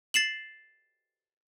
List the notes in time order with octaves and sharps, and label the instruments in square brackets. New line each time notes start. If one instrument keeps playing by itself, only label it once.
[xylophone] A6 C7 E7 F#7